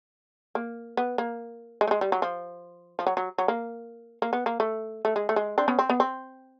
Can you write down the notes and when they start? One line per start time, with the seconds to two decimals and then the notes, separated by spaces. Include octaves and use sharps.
0.55 A#3
0.97 B3
1.18 A#3
1.81 G#3
1.87 A3
1.91 G#3
2.01 G3
2.12 F#3
2.22 F3
2.99 F3
3.07 F#3
3.17 F#3
3.38 F#3
3.48 A#3
4.22 A#3
4.33 B3
4.46 A#3
4.60 A3
5.05 A3
5.16 G#3
5.29 A3
5.36 G#3
5.58 C4 D4
5.68 B3 C#4
5.79 C4
5.90 B3
6.00 C4